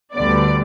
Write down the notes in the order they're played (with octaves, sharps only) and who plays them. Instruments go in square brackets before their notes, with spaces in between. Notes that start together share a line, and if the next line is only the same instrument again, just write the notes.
[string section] D2 D3 G3 B3 D5